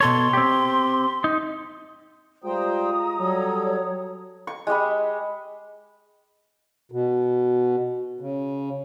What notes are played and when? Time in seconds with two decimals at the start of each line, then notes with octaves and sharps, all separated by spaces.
0.01 B2 A4 C#5 C6
0.33 C4 G4
1.24 D#4
2.44 G3 G#3 F4 C5 G5 A#5 D#6
3.19 F#3 G3 A4 C#5
4.47 C#6
4.67 G#3 G4 D#5 B5
6.92 B2
8.20 C#3